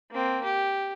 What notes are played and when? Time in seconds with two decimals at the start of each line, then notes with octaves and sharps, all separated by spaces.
0.12 A#3 C4
0.43 G4